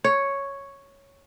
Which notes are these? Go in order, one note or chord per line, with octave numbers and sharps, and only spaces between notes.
C#5